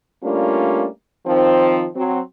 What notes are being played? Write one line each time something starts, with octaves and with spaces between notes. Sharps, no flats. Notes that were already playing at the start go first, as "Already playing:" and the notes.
G3 A3 A#3 C#4 D4 F4
D#3 F3 C4
F#3 C4